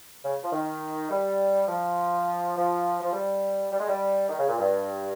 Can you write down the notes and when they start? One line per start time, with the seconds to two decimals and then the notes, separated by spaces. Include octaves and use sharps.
0.24 C#3
0.43 F3
0.52 D#3
1.10 G3
1.68 F3
2.56 F3
3.02 F3
3.13 G3
3.72 G3
3.79 G#3
3.88 G3
4.29 D#3
4.38 C#3
4.48 A#2
4.58 G2